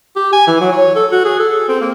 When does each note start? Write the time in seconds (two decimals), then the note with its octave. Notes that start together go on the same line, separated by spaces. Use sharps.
0.16 G4
0.33 G#5
0.47 E3
0.61 F#3
0.72 C#5
0.95 A4
1.12 F#4
1.25 G#4
1.39 A4
1.69 C4
1.81 A#3